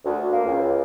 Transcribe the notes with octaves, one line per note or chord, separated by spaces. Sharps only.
D2
A#3
C#2